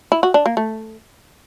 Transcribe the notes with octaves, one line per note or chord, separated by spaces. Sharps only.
E4
F#4
D4
A#3
A3